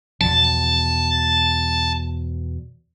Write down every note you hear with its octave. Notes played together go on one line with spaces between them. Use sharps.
E2 B2 F3 A5